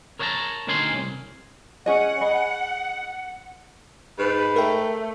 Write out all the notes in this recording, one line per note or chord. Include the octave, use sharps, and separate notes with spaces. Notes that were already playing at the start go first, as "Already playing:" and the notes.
A#4 C#5 D#5 F#5 A5 A#5
D2 D#3 C#4 A#4 G#5 C6
C2
C#4 G#4 D#5 F#5
G#4 D#5 B5
G#2 B4
A3 A#4 G5